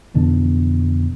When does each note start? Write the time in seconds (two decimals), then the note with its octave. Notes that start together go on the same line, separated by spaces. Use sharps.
0.14 F2 B2 D3 E3